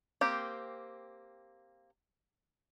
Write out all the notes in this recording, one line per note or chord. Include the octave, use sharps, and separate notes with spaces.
A#3 C4 G4